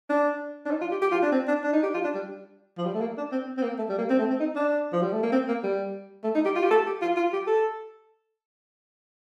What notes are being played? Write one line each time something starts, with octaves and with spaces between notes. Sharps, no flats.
D4
D4
D#4
F4
G4
G4
F4
D4
C4
D4
D4
D#4
G4
F4
D4
G3
F3
G3
A3
A#3
D4
C4
C4
A#3
A3
G3
A#3
C4
A3
C4
D#4
D4
F3
G3
A3
A#3
C4
A#3
G3
A3
D#4
G4
F4
G4
A4
G4
F4
F4
G4
A4